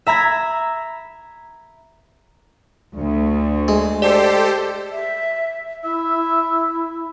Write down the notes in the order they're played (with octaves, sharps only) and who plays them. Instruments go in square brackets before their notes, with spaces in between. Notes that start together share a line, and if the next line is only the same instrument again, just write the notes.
[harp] E5 A#5 B5 G#6
[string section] D2
[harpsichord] G#3
[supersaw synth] G4 A4 C5 [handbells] D5
[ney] E5
[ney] E4 [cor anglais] E5